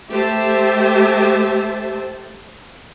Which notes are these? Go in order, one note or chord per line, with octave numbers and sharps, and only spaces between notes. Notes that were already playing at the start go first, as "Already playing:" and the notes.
A3 G4 C5 E5 A5